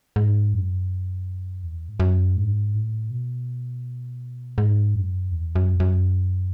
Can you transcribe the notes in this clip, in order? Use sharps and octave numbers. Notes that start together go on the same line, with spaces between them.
G#2
F#2
E2
G#2
F#2
G#2
A2
B2
G#2
F#2
E2
F#2
F#2